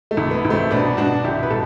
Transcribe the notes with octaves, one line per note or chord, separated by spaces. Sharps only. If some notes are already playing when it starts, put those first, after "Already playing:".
A3
C2
B3
C2
A3 C4
B2 B3 D4
B2 D4 F#4
C2 E4 G4
B4
B2 A4